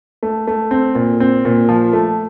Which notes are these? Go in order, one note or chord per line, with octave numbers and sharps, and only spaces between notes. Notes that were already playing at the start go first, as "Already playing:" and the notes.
A3
A3
C4
A#2
C4
A#2
F3
A3